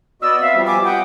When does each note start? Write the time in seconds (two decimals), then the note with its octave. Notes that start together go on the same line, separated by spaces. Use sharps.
0.22 B3 F#4 D5 D#5 E6
0.41 C4 E5 F5
0.55 F3 G3 B3
0.67 G#5 D6
0.85 D#5 F#5 G5